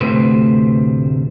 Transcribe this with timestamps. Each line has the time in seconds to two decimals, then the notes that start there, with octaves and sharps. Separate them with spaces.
0.01 D2 A2 C3 B4 C5